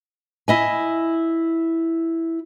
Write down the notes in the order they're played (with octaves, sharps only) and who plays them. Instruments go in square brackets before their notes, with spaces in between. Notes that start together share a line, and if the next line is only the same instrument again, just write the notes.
[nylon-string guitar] E4 D#5 G#5